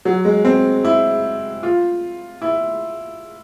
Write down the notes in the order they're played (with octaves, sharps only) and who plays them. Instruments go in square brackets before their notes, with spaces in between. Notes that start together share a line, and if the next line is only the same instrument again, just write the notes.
[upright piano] F#3
G#3
C4
E4
F4
E4